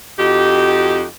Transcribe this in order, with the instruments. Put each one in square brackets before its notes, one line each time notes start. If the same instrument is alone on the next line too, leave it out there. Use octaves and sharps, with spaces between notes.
[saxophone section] F2 D#4 F#4 G4